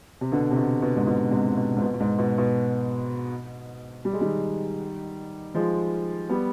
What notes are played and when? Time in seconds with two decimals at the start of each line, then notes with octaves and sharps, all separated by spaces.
0.21 C3
0.32 B2 D3
0.51 C3
0.57 B2
0.82 B2
0.97 G#2
1.07 B2
1.31 G#2 C3
1.57 B2
1.77 G#2
1.81 B2
1.94 B2
2.00 G#2
2.18 B2
2.38 B2
4.05 G3
4.13 G#3
4.21 D#3 G3
5.55 F3 G#3
6.29 G3 B3